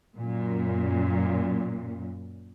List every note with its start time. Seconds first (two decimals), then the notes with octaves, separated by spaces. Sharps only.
0.18 F#2 A#2